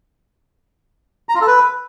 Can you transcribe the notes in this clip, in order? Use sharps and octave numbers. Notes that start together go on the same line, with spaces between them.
A#5
F4
A4
B4